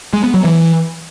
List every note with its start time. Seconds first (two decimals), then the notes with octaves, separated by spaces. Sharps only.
0.13 G#3
0.24 B3
0.34 F#3
0.44 E3